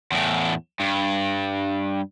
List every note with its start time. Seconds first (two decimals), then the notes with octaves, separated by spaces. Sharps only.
0.12 E2 A2
0.80 G2